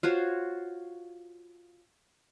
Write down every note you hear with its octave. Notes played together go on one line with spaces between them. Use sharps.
F4 F#4 C5 C#5